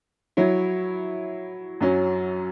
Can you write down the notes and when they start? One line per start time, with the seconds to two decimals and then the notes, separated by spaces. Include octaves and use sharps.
0.37 F#3 E4 C#5
1.81 F#2 F#3 C#4